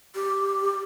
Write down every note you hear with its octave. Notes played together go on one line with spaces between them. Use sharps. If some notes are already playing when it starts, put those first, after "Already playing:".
G4